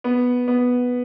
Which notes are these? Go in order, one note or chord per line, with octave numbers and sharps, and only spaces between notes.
B3
B3